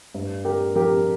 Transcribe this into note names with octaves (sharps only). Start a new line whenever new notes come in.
G2
D3 G4 A#4
F3 G4 A#4